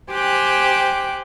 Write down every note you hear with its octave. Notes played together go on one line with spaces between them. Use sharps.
G4 C5 G5 G#5 D6 F#6